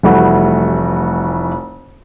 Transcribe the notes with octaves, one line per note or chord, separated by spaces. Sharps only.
F1 E3 G3 A3 F#4